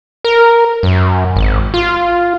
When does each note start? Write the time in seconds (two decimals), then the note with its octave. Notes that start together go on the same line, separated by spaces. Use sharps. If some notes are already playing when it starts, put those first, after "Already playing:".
0.24 A#4
0.83 F#2
1.36 G#1
1.74 F4